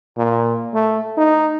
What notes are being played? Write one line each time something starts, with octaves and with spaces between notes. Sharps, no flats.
A#2
A3
D#4